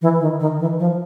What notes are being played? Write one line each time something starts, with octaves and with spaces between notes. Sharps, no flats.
E3
D#3
D#3
E3
F3